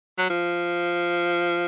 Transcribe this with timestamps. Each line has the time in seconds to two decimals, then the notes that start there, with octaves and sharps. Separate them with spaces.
0.19 F#3
0.30 F3